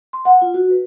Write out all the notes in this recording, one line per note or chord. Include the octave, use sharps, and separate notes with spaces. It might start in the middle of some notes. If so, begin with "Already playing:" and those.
C6
F#5
F4
F#4
B4